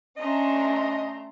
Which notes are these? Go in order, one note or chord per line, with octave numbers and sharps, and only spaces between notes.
A3 C#4 D4 D#5 A#5 C6